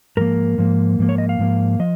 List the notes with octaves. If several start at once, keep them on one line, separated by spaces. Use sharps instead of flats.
G#2 F3 A#3 A#4
G#2 F3 A#3
G#2 F3 A#3
C#5
D#5
F5
G#2 F3 A#3
F3 D#5